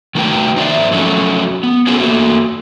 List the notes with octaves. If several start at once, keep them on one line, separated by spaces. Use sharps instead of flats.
D#3 A3 D#4 F#4 B4 G5
D#4 C5 D5 E5
F3 F#3 A3 C#4 F#4
B3
C#4 F#4 G#4 A4 C5
A3 A#3 F#4